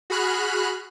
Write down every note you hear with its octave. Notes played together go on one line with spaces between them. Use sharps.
F#4 G#4 B5 F6 F#6